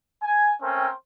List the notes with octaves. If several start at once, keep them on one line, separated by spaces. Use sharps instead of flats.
G#5
A3 C4 C#4 A#4 C5 G5